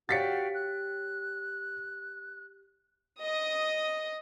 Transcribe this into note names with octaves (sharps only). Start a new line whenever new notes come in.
F#4 G4 C#5 F5 G5 A6 B6 C#7
F#6
D#5 D#6